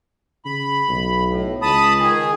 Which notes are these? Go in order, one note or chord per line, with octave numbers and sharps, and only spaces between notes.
C#3 B5
B1
A2
C#2 A5 B5 D#6
D#3 G#4